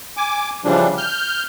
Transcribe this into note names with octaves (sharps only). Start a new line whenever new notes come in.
G#5 D6
C#3 E3 F3 G3 D4
F6 G6